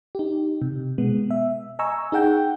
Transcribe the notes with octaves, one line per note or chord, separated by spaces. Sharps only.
D#4 G4
C3
B2 G#3 B3
E5
D#5 G#5 A#5 C#6 E6
D#4 G#4 F#5 G5 G6